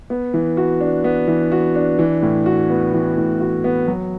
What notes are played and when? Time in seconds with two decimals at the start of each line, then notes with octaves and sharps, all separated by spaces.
0.10 B3
0.34 E3
0.57 F#4
0.80 D4
1.04 B3
1.27 E3
1.52 F#4
1.75 D4
1.99 E3
2.22 A2
2.46 F#4
2.70 B3
2.94 E3
3.17 A2
3.40 F#4
3.64 B3
3.88 F#3